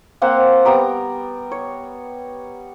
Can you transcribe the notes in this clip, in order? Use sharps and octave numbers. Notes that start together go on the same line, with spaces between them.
A#3 C4 C5 F#5
G3 B3 A#5 D6
C#5